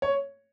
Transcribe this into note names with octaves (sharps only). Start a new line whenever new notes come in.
C#5